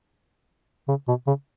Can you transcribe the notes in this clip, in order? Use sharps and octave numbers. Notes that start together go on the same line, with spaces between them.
C#3
B2
C#3